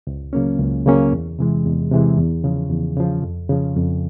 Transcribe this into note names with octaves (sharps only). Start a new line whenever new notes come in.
C#2
C#3 F#3 A#3 C#4
C#2
C#3 F#3 A#3 C#4
E2
C3 E3 G#3
E2
C3 E3 G#3
E2
C#3 F3
E2
C#3 F3
F2
C#3 F3
F2